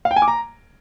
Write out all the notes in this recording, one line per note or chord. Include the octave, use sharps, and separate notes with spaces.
F5
G5
G#5
D6
A#5